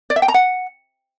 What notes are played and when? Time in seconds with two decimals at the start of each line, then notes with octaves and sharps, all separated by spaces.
0.10 D5
0.16 E5
0.22 G5
0.28 A#5
0.34 F#5